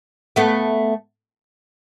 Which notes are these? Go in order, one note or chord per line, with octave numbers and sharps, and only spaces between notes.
A3 B3